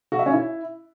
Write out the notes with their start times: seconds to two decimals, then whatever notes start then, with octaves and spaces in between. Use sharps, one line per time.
0.12 F#4
0.19 E5
0.26 C#4
0.33 E4